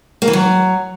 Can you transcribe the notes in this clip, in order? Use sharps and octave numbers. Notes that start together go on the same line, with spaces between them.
A#3
E3
F#3